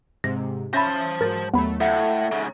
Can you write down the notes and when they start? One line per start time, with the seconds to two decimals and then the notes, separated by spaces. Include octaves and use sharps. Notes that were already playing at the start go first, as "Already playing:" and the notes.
0.24 G#2 C3 A#6
0.74 C#4 C5 E5 A5 B5 A#6
1.21 G#2 F#3 A#4 A6
1.54 D#2 F#3 A3 B3 B5
1.81 A2 A4 E5 F#5 G#6 C#7
2.32 G#2 C#3